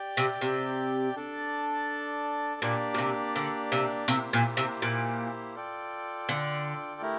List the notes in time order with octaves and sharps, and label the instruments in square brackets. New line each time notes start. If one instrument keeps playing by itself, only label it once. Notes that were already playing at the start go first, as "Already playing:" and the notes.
Already playing: [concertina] G4 D5 G5
[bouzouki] C3
C3
[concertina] D4 A4 D5
[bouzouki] A#2 [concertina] A#3 D4 G4 D5
[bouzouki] A#2
C3
D3
C3
[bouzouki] C3 [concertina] A#3 E4 G4 C5
[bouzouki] A#2
C3
A#2
[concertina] F4 A4 D5 G5
[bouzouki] D3
[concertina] A3 E4 G4 A#4